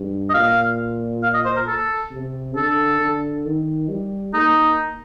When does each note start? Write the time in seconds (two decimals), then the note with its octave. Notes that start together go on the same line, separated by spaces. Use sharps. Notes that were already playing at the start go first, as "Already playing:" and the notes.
Already playing: G2
0.30 D#5
0.34 A#2 F5
1.23 F5
1.34 D#5
1.45 C5
1.56 A#4
1.67 A4
2.12 C3
2.56 D3 A4
3.00 D3
3.45 D#3
3.89 G3
4.34 A#3 D#4